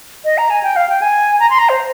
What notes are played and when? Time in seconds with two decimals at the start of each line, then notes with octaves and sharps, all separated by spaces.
0.25 D#5
0.38 A#5
0.50 G#5
0.63 G5
0.76 F5
0.89 G5
1.02 G#5
1.40 A#5
1.50 C6
1.59 A#5
1.69 C5